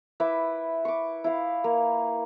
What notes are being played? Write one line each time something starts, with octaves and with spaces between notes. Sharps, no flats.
E4 B4 E5 D6
C#6 D6
E4 F5
A#3